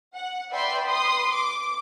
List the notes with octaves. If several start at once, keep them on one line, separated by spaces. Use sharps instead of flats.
F#5
B4 D5 E5 G5 B5 C6
B4 C6 D#6
D6